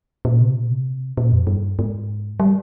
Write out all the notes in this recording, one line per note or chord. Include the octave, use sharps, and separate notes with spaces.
A#2
C3
A#2
C3
A#2
F2
G2
G#2
G3